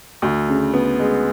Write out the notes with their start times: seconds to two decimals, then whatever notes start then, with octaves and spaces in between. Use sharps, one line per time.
0.22 D2
0.48 C#3
0.73 B3
0.99 G#3